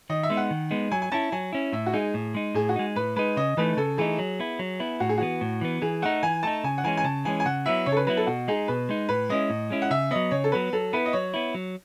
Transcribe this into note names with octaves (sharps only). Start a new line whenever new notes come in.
D#3 D#5
E5
G#3 B3 D#4
F#5
D#3
G#3 B3 D#4
F#3 G#5
G#5
C#4 E4 A5
F#3 G#5
C#4 E4
A2 E5
F#4
G#3 D#4 G#4
A2
G#3 D#4
A2 G#4
F#4
G#3 D#4
A2 B4
G#3 D#4 B4
C#3 D#5
E3 A3 D#4 B4
C#3 A4
E3 A3 D#4 G#4
F#3
B3 E4
F#3
B3 E4
A2 F#4
G#4
E3 B3 F#4
A2
E3 B3
E3 G#4
A3 D#4 F#5
E3 G#5
A3 D#4 A5
C#3 G#5
F#5
E3 G#3 C#4 G#5
G#5
C#3 A5
E3 G#3 C#4 G#5
G#5
C#3 F#5
F#3 B3 E4 E5
C#3 C#5
A4
B4
F#3 B3 E4 B4
A4
B2 F#4
G#3 D#4 G#4
B2 B4
G#3 D#4
A2 B4
G#3 C#4 E4 D#5
A2
G#3 C#4 E4
F#5
C#3 E5
F#3 B3 D#5
C#3 C#5
A4
F#3 B3 B4
F#3 A4
B3 E4 B4
D#5
F#3 C#5
B3 E4
F#3